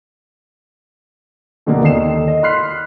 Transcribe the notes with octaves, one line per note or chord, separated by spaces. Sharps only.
B2 D3 D#3 A#3
D#2 D#3 D#4 A4 C7 E7
D#5
B5 C6 F6 F#6 B6 C7